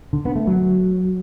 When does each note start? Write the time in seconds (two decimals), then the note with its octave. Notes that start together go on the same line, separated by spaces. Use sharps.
0.13 D3
0.25 B3
0.36 A3
0.47 F#3